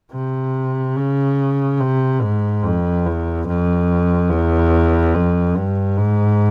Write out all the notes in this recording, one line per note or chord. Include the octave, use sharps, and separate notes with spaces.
C3
C#3
C3
G#2
F2
E2
F2
E2
F2
G2
G#2